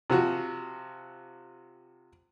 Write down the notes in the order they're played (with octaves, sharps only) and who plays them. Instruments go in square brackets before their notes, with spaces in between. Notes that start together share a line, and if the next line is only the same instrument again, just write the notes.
[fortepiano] C3 F3 F#4